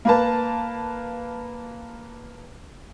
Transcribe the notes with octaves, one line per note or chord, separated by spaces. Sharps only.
A#3 B4 A5